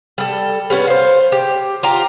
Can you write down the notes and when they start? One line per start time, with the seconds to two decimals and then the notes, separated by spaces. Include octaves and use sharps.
0.18 G3 A4
0.70 G3 B3 C#4
0.87 C5 F5
1.32 G4
1.83 F4 G4 A#5